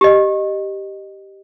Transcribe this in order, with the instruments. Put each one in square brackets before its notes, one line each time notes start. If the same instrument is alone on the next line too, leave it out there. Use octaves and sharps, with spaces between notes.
[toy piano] G4 D#5